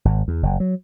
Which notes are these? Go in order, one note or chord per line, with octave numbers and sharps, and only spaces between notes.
G#1
E2
F#1
F#3